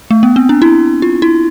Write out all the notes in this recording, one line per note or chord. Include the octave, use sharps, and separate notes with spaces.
A3
B3
C4
D4
E4
F4
E4